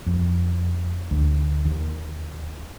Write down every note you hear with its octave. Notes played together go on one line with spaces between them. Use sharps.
F2
D2
D#2